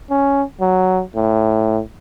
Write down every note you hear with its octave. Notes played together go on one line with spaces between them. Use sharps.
C#4
F#3
A2